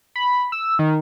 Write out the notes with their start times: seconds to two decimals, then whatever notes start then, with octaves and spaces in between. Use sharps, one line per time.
0.16 B5
0.52 E6
0.79 D#3